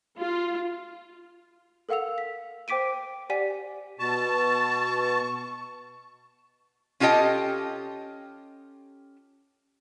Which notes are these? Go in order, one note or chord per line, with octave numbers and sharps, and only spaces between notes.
F4
A4 A#4 F5 F#5 E6 F7
B6
C5 G5 D6 B6 D7 D#7
G4 D5 F#5 G#5 B6 D#7
B2 A5 C#6
C#4 F4 G4 A4 D#5 G5